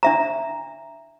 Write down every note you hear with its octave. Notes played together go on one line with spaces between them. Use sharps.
D4 E5 A#5